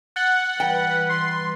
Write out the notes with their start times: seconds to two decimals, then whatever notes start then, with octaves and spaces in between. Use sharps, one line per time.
0.16 F#5 F#6 A6 G7
0.60 E3 G3 B4 G5
1.09 C6